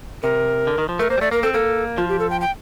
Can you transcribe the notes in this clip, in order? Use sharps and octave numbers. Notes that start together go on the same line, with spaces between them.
C3 A#4
D3
D#3
F3
A3 A#4
A#3 C5
G3
A3 D5
A#3 A#4
C4 A4
A#3 A4
F3 F4
G4
A4
G5
G5